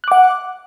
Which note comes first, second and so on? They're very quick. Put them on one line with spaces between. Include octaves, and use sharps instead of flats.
F#6 D6 F#5